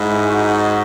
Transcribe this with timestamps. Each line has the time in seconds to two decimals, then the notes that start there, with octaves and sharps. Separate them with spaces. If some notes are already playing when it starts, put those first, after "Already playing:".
Already playing: G#2 E4
0.18 G#4
0.29 D#4 F#4